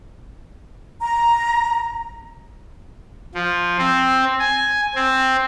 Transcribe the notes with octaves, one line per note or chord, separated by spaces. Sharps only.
A#5
F3
C4
G#5
C4